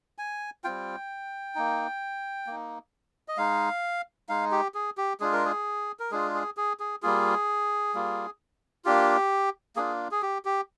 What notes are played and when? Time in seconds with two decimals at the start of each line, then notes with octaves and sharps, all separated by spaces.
0.18 G#5
0.64 G3 C4 F4 G5
1.55 A#3 D#4
2.47 A#3 D#4
3.28 D#5
3.37 G#3 D#4 F5
4.29 G#3 D#4 F5
4.52 G4
4.74 G#4
4.97 G4
5.20 G#3 D4 F4 G#4
5.33 A#4
5.45 G#4
5.99 A#4
6.11 G#3 D4 F4 G#4
6.34 G#4
6.57 G#4
6.80 G#4
7.03 G3 A#3 F4 G#4
7.94 G3 A#3 F4
8.85 A#3 D4 F4 G4
9.76 A#3 D4 F4 G#4
10.11 G#4
10.22 G4
10.45 G4